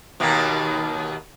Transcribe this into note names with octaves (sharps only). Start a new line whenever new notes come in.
D#2 B2 A#3